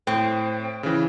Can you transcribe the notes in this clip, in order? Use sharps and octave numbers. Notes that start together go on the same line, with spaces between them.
A2 C4
C#3 E3